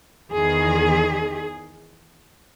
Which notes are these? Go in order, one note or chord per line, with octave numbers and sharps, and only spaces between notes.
E2 D#3 G#4